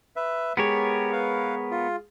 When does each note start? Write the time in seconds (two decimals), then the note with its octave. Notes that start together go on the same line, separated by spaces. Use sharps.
0.16 B4 E5
0.57 G#3 B3 G4 A#4 C#5
1.12 B4 F5
1.71 F4